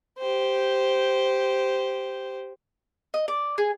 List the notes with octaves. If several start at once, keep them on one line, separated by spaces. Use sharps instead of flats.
G4 C5
D#5
D5
G#4